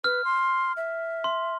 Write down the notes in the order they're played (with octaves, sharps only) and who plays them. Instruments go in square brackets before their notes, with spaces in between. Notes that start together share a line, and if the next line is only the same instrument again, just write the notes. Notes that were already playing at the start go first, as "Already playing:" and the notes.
[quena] B4 [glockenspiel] F6
[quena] C6
E5
[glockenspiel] C6